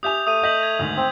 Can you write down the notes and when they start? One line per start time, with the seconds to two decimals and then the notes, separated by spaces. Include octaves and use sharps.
0.03 G4 E5 G#5 D#6 G6 F7
0.27 A3 D#6 D#7
0.44 D#5 G6 B6 F#7
0.63 G#6
0.79 D2 G#2 D#3
0.97 C4